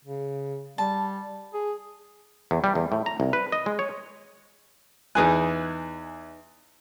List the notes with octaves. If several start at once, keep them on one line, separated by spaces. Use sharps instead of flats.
C#3
G3 A5
G#4
E2
G3
E2
A2
A#5
C2
B4
D#5
G#3
C#5
E2 D#4 G#4 B4 G#5 F#6